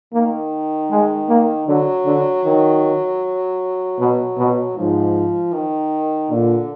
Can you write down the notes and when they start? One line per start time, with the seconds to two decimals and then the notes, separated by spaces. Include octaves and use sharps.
0.13 D#3 A#3
0.91 G#3
1.29 A#3
1.68 D3 F#3
2.06 D3
2.45 D#3
3.99 B2
4.38 B2
4.76 G#2 F3
5.53 D#3
6.30 A#2 D3